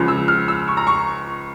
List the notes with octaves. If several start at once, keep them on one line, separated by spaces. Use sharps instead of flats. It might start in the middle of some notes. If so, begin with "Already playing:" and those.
Already playing: C#2 C#3 F3
E6
F6
E6
C#6
A#5
C#6